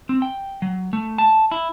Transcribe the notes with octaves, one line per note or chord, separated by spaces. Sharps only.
C4
G5
F#3
A3
A5
E4